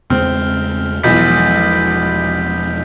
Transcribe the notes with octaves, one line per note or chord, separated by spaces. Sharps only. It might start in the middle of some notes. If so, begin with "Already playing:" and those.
E2 C#3 G#3 C4 F6
E1 B1 E3 F3 G#3 G6 B6